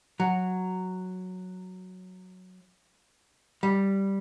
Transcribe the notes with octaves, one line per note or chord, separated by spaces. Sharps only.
F#3
G3